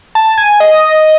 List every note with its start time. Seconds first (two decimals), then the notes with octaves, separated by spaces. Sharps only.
0.15 A5
0.38 G#5
0.60 D#5